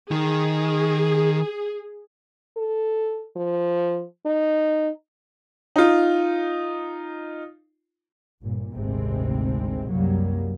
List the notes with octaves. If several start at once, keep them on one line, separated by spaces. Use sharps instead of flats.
D#3 G#4
A4
F3
D#4
D#4 F4
G1 A#2
G#1 D2 C3 G#3 C4
C2 F#2 F#3 G3 A#3